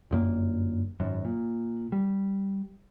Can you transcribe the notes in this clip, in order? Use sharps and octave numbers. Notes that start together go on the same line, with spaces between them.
G1 F#2 A#3
G#1 F#2
A#2
G3